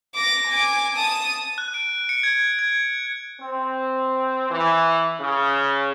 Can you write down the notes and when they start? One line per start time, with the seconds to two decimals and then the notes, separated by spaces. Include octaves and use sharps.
0.15 D6 A#6
0.48 G#5 D6
0.97 A5 D#6
1.58 F#6
1.74 D7
2.09 C#7
2.23 G#6
2.59 G#6
3.40 C4
4.50 E3
5.20 C#3